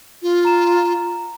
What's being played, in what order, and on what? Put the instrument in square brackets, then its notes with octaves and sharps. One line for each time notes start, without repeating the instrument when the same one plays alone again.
[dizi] F4
[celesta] A#5 E7